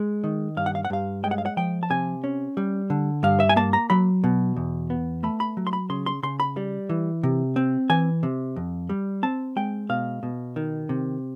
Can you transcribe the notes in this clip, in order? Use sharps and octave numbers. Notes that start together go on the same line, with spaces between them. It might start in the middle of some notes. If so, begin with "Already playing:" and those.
Already playing: G#3
D#3
G2 F5
F#5
F5
F#5
G2 F5
G#3 G5
F#5
F5
F#5
F3 G5
A5
C3 G#5
C#4
G3
D3
G2 F5
E5
G#5
A#3 A5
A#5
F#3 B5
B2
E2
B3
A3 B5
B5
F#3
C6
B5
C#3 C6
C6
C#3 C6
B5
G3
E3
C3
C4
E3 G#5
C3
F2
G3
C4 A5
G#3 G5
B2 F5
B2
D#3
C3